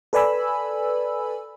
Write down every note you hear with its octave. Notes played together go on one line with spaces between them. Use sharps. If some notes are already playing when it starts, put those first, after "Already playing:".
A4 B4 D5 G#5 B5 E6